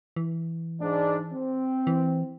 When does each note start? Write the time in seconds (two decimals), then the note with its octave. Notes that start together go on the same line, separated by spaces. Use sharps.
0.16 E3
0.81 G#2 D4
1.33 C4
1.87 E3